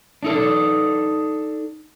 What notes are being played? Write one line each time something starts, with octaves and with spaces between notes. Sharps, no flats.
D4 D#4 A4